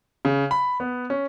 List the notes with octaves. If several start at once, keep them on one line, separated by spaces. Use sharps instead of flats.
C#3
B5
B3
C#4